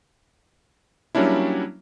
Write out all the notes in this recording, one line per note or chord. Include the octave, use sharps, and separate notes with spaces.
F#3 G3 A#3 C#4 D4 E4